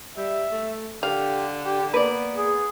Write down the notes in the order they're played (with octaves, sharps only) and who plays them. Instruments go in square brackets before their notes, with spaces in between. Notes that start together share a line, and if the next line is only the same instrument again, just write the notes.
[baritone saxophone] G3 [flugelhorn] E5
[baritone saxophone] A3
[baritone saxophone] D3 [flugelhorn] G4 [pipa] F5
[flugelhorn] G4
[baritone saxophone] A#3 [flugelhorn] B3 [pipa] B4 D5
[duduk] G#4